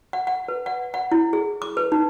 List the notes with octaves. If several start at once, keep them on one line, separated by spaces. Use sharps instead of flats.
F#5
F#5
B4
F#5
F#5
E4
G#4
D6
B4
D#4